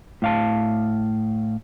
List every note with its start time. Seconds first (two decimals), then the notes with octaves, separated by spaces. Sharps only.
0.22 A2 F5 A5